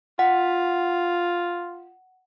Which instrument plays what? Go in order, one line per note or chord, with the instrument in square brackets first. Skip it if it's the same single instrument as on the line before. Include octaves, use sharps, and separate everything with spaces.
[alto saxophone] F4 [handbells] F#5